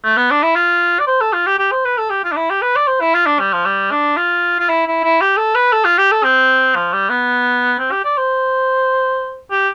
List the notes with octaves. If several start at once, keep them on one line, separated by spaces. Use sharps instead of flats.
A3
B3
D4
E4
F4
D5
C5
A4
F4
G4
G4
C5
B4
A4
G4
F4
D4
E4
G4
B4
D5
C5
E4
F4
D4
G3
F3
G3
D4
F4
F4
E4
E4
E4
G4
A4
B4
A4
F4
G4
A4
C4
F3
G3
B3
C4
G4
D5
C5
G4